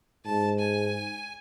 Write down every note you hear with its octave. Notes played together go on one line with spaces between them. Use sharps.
G#2 A5
G#5